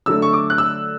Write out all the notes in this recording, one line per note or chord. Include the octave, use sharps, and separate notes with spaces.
D3 F#3 A3 E6
C#6
D6
F#6
E6